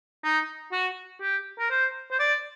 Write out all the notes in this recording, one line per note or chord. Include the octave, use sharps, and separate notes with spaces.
D#4
F#4
G4
A#4
C5
C5
D5